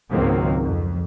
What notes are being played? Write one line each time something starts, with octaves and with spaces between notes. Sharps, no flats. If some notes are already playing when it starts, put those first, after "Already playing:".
C#2 G#2 D#3 F#3 A#3 C4
F2